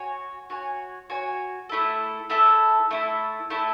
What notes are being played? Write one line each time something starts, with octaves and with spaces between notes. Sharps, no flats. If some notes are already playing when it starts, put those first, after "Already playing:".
Already playing: F#4 C#5 G#5
F#4 C#5 G#5
F#4 C#5 G#5
A3 E4 A4
A3 E4 A4
A3 E4 A4
A3 E4 A4